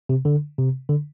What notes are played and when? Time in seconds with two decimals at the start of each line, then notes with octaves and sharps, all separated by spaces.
0.09 C3
0.25 D3
0.58 C3
0.89 D3